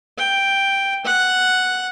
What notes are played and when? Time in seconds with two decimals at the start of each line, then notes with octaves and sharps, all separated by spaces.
0.18 G5
1.05 F#5